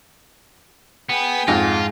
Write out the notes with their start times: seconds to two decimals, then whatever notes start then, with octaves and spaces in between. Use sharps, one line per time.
1.10 B3 G#4 G5
1.48 F2 G#2 F4 A#6